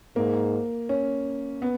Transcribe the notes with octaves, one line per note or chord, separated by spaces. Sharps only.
G#2 A#3
C#4
B3